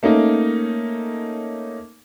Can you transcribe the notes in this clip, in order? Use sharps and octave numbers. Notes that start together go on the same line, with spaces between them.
A3 A#3 C#4 D#4